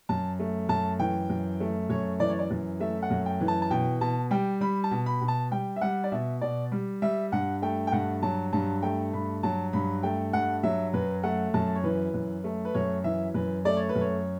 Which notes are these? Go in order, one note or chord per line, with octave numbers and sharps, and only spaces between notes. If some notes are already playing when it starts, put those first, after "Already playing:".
F#2 A5
A3
F#2 A5
E3 G5
F#2
A3
F#2 C#5
E3 D5
C#5
D5
F#2
A3 E5
F#5
F#2
G5
E3
A5
A5
B2 G5
B2 A5
G3 G5
G3 B5
A5
B2
B5
B2
A5
G3 G5
E5
G3 F#5
D5
B2 E5
B2 D5
G3
G3 E5
G2 F#5
A3 G5
G5
G2 F#5
F#3 A5
G2 A5
A3 G5
G2 B5
F#3 A5
G2 B5
A3 G5
G2 F#5
F#3 E5
F#2 B4
A3 F#5
F#2 A5
C#5
E3 B4
F#2
A3
B4
F#2 C#5
E3 E5
F#2 B4
A3 D5
C#5
B4
F#2
C#5